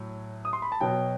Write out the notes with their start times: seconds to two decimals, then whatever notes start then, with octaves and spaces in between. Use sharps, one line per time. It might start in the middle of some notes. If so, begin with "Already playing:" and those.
Already playing: A2 F#3
0.45 D#6
0.53 C6
0.62 B5
0.72 A5
0.81 B2 F#3 G5